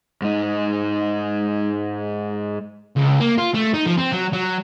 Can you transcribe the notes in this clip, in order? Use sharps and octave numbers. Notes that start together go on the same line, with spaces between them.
G#2 D#4
C#2
A#3
F4
A3
D#4
F3
C4
F#3
F#3